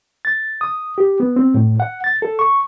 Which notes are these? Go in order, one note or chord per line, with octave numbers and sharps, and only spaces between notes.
A6
D#6
G4
B3
C4
A2
F#5
A6
A4
C#6